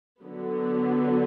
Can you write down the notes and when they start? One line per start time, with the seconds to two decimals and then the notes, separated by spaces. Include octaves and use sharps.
0.21 D3 F#3 B3